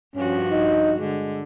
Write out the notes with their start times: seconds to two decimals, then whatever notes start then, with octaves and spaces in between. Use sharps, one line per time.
0.15 G2 F3 C#4 F#4
0.52 D#4
1.00 D3 G#3